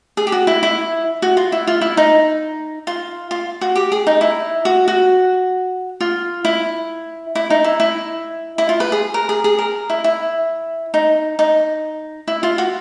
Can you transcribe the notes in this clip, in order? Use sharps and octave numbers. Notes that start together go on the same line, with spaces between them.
G#4
G4
F#4
E4
E4
F#4
F4
E4
F4
E4
D#4
F4
F4
F#4
G4
G#4
D#4
E4
F#4
F#4
F4
E4
E4
D#4
E4
E4
E4
F4
B4
G#4
A#4
G#4
G#4
A#4
E4
E4
D#4
D#4
E4
F4
F#4